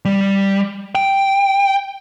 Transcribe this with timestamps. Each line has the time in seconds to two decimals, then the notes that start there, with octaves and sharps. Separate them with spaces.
0.05 G3
0.95 G5